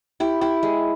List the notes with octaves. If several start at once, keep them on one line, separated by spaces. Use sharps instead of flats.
E4 G4
E4 G4
G#3